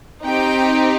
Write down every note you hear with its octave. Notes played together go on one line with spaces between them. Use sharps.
C4 D#4 G4 G5